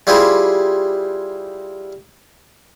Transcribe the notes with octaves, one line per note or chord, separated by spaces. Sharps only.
G3 E4 F4 G4 G#4 C5